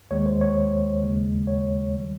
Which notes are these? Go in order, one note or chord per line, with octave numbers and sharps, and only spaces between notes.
D#2 D#3 G#3 C#5
C5
C#5
D#2 C#3 G#3
C#5
D#3 G3